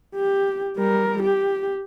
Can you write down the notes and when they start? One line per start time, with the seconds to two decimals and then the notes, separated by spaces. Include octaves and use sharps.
0.15 G4
0.77 G3 A#4
1.23 G4